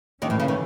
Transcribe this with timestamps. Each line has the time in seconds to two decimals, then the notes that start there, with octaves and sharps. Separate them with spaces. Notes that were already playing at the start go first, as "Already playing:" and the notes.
0.22 D#2 D#3 E3 A3 C#4
0.30 A2
0.40 C#3
0.48 D#3